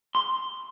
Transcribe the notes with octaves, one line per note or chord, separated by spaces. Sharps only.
C6